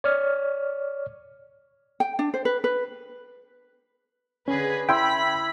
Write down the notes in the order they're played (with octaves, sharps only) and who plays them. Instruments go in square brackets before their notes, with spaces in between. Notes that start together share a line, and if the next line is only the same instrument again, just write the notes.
[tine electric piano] C#5 D5 C#6 F6
[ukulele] G5
D4
C5
B4
B4
[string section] D3 G#4 B4 [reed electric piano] C#4
[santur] E4 C6 E6 [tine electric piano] G5 [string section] B5 B6